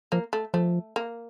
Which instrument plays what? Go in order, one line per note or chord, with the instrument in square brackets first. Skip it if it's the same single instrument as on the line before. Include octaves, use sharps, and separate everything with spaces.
[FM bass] F3 [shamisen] A#3
[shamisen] A3
[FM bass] F3 [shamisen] A3
[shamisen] A#3